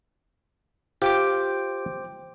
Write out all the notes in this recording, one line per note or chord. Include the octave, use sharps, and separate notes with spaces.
F4 G4 C5 G5 D6